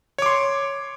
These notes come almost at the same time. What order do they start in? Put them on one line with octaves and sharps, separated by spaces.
C#5 D6 C6